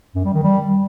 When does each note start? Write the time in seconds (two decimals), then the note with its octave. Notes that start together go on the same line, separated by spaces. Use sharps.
0.16 F#2
0.25 G3
0.34 D#3
0.44 G3